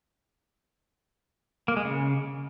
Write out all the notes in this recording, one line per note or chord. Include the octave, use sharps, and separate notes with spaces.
A#3
G#3
C#3